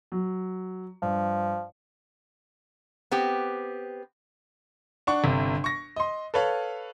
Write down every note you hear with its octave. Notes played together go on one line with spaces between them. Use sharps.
F#3
G2 F3
B3 C4 G4
D4 F#5 C#6
G1 C3
C#6 A#6
D#5 C6
A4 B4 C#5 F5